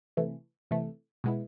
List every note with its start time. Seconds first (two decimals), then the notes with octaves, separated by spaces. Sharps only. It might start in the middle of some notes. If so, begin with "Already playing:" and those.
0.17 C3 E3 A3
0.71 C3 E3 A3
1.24 B2 G#3 B3 E4